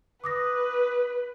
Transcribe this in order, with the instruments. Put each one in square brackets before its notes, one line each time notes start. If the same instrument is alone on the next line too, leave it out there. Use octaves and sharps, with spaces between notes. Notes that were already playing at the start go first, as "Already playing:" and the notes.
[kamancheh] B4 [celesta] D6 D#6 A#6